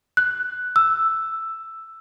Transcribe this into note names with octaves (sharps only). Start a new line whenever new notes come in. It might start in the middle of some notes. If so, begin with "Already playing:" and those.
F#6
E6